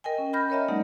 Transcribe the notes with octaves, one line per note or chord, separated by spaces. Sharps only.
A#4 D#5 G5 G#5
C#4
B5 F6 G6 A#6
A#4 C#5 D#5 E5 A#5
F#3 G#3 A#3 D#4 D5 F#5